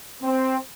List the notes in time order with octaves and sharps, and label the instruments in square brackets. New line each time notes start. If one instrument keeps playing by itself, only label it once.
[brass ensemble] C4